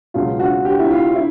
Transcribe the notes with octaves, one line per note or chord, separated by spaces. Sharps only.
C#2 B2 F#3 F4
F#4
G4
E4
F4
E4